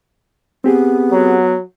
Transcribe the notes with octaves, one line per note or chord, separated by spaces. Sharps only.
B3 C4 G4 G#4
F#3